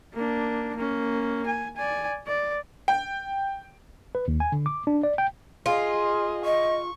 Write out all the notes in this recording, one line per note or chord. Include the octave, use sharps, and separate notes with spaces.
A#3 D4
A#3 C#4
G#5
D5 G#5
D5
G5
B4
D#2
G#5
D3
D6
D4
D5
G5
F4 G#4 D#5
D#5 C#6